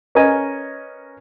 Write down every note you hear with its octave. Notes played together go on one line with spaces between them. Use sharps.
C#4 A#4 B4 C#5 D#5 G#5